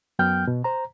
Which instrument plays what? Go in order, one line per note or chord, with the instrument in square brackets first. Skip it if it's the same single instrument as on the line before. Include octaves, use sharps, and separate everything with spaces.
[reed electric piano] F#2 F#3 B3 G5 F6 G6
B2
C5 A#5